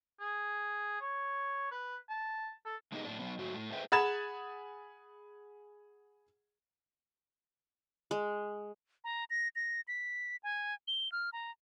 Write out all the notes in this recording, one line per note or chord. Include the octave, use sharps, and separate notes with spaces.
G#4
C#5
B4
A5
A4
G#3 B3 D#4 G4 G#4 D#5
A2 D4
F#3 B3
G#2 F#3 A3 F#4
A2 A3
G#4 A4 B4 C5 E5 G5
G#4 F#5 B5 G#6 A6 E7
G#3
A#5
A#6
A#6
B6
G#5
G7
F6
A#5